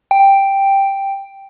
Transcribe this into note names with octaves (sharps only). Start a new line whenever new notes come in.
G5